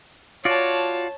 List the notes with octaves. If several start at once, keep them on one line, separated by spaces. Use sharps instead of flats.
F4 F#4 C#5 D5 A5